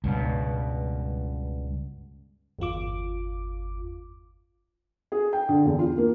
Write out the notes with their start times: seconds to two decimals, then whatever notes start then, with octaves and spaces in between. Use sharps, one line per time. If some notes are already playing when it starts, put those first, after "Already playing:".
0.04 C#2 G2 B2
2.59 G1 E2 F4 D6
5.12 G#4
5.33 G5
5.49 D3
5.65 E2
5.79 F4
5.98 A#3